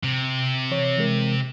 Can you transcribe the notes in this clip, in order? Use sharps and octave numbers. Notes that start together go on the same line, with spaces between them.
C3
E3 C#5
E3 G#3 A#4